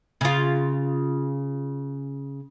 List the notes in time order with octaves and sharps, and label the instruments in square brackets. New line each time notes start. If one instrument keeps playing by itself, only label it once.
[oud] C#3 F4